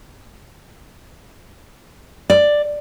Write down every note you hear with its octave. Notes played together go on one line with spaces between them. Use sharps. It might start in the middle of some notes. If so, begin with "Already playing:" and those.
D5